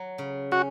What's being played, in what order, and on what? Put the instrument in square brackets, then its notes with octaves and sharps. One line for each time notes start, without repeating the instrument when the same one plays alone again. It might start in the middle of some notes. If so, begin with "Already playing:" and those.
Already playing: [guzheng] F#3
C#3
[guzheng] C#4 [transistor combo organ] F#4